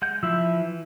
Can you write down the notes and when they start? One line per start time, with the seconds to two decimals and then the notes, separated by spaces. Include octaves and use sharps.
0.02 G#3 F#5 G6
0.23 F3 E4 E6
0.42 E3